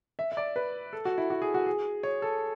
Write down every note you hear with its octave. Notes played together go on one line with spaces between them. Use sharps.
E5
E5
D5
B4
A4
F#4
E4
F#4
G#4
F#4
G#4
C#5
A4